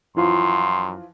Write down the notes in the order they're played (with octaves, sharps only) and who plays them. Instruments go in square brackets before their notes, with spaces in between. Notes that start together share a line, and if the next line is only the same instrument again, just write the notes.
[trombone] F#2 [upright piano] E3 F3 F4 [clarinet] C6